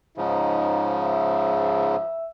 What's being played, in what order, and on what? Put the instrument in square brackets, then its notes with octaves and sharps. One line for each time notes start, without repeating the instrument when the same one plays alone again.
[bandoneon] G#2 C#3 F3 [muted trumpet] D#4
[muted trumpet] E5